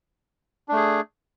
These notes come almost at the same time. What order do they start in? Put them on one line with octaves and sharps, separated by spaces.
D4 A3 G#4